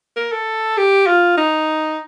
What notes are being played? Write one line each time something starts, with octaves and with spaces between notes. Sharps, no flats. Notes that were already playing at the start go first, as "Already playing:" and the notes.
A#4
A4
G4
F4
D#4